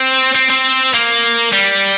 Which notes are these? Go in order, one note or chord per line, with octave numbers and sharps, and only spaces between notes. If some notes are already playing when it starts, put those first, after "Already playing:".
Already playing: C4
C4
C4
A#3
G3